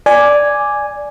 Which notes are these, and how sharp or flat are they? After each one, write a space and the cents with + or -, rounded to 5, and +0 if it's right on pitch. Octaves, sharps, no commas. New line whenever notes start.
D5 +0 G#5 +0